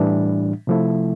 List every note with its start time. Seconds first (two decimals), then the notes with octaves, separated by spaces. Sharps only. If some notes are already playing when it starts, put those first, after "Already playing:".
Already playing: A2 E3 G3 D4
0.67 C3 F3 A3 E4